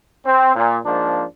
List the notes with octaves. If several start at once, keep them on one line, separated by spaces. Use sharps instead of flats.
C4
A#2
G#2 F3 A#3 D4